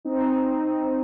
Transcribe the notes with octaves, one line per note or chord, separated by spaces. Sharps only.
C4 D#4